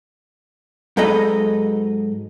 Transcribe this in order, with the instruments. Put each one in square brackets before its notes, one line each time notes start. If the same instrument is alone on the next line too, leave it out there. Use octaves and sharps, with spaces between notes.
[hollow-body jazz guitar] G#2 F#3 A4 B4 D#5 A#5